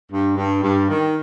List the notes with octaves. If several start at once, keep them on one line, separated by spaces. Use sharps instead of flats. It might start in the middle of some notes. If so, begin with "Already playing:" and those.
G2
G2
G2
D#3